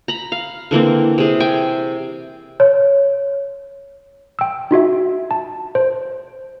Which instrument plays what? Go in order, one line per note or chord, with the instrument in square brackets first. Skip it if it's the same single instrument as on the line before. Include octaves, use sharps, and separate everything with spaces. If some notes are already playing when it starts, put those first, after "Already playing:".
[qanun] A#5 B5
F5
D3 E3 A#3 C4
C3 G#4
G5 G#5
[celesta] C#5
[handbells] G5 E6
D#4 F4 F#4 E5
A5
C5